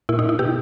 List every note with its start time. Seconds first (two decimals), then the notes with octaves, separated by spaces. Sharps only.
0.09 A#2 E4
0.19 D#4
0.29 E4
0.39 B2 G4